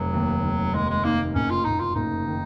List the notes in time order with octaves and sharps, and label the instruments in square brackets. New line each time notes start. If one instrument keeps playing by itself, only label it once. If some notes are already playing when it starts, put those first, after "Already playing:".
Already playing: [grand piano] F1 [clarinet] F#3
[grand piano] D#2
D#2
[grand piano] D#2 [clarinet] G#3
[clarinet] G#3
[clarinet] A#3 [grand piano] D#4
[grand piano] F#1 [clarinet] C#4
[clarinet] F4
[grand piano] F#1 [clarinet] D#4
[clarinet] F4
[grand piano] F#1 [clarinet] D#4
[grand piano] D#3